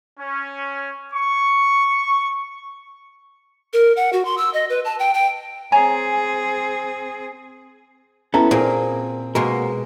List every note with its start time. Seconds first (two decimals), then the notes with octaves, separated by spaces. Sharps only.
0.19 C#4
1.13 C#6
3.73 A#4
3.97 F#5
4.13 F#4
4.25 C6
4.38 E6
4.53 D#5
4.70 B4
4.85 A5
4.99 G5
5.14 G5
5.72 C4 G#4 C#5 G#5 A#5
8.34 B3 C#4 E4 A4 A#5
8.51 A#2 C4 G#4 A#4
9.35 B2 G#3 A#3 F#4 A#4